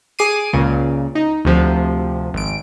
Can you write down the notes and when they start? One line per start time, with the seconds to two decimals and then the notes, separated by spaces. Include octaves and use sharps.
0.19 G#4 D6 C7 D#7
0.53 C#2 A#2 C#3
1.15 D#4
1.45 D2 C3 F3
2.34 G#1 D7